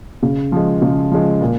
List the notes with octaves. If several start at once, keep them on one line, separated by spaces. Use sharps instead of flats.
C#3
F3 G#3
C#3
F3 G#3
A#2